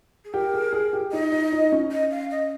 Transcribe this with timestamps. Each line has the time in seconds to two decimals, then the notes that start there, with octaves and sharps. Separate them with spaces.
0.25 G#4
0.33 G4 A#4
0.54 G#4
0.73 G#4
0.93 G4
1.12 D#4 D#5
1.32 D#4
1.52 D#4
1.72 C#4
1.91 D#5
2.11 F5
2.31 D#5